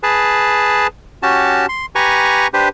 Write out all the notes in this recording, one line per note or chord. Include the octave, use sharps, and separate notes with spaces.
G#4 B4 A5
C#4 F#4 G4 A5
C6
G4 B4 G#5 A#5 C#6
D4 G4 B4 C5